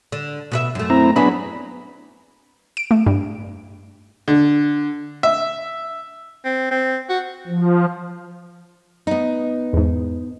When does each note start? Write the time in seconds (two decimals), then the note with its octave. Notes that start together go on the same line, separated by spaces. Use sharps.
0.12 D3
0.52 B2 B4 E5
0.75 F#2 A3
0.90 C4 E4 A#5
1.16 F#3 B3 D4 E4 G#4 B5
2.77 D7
2.91 A3
3.07 G2
4.28 D3
5.23 E5
6.44 C4
6.71 C4
7.10 F#4
7.47 F3
9.07 B3 D#4
9.73 E2 G#2